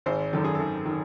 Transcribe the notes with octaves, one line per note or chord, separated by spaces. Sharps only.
G#1 C5
F#2 D#3 A4
G#4
G#1 A4
D#3